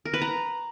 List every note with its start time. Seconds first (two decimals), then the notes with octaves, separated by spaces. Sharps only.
0.05 A#4
0.13 B4
0.21 A#5